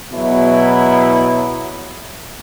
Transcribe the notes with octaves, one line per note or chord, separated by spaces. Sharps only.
E2 B2 F#3 B3 E4